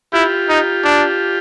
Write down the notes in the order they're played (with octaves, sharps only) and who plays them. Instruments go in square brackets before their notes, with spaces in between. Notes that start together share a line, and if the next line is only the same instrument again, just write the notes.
[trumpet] E4 [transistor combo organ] F4 G4
[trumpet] D#4
D4